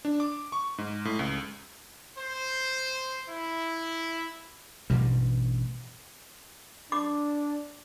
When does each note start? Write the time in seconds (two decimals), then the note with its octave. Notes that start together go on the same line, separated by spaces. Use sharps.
0.05 D4
0.20 D6
0.52 C#6
0.78 G#2
1.05 A2
1.19 C#2
2.17 C5
3.28 E4
4.90 A1 G2 B2 G3
6.92 D4 D6